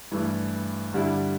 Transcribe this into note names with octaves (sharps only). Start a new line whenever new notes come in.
G2 E3 A3
G2 D3 G3 E4